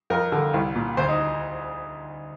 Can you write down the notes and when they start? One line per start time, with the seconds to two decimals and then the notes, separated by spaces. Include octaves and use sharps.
0.10 F2 A#4
0.32 D3
0.54 C2
0.75 A#2
0.97 D2 C5
1.08 D#4